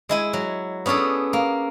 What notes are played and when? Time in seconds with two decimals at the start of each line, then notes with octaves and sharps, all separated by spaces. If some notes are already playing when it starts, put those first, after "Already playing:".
0.09 G#3 E4 G#5
0.33 F#3
0.86 B3 C#4 D4 G#4 A4
1.33 A#3